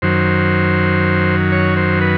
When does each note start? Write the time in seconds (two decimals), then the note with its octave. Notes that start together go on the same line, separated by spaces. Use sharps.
0.02 F#2 D#3 F#3 C5
1.52 C#5
1.77 C5
2.01 B4